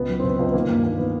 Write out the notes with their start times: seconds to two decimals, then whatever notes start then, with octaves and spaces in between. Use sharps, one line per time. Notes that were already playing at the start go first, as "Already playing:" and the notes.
Already playing: C#2 B3
0.09 F#3
0.19 C4
0.23 C#2 B3
0.39 C#2
0.47 B3
0.54 D#3 A#3
0.69 G2 A#3
0.84 D#3 A#3
0.98 D#3 B3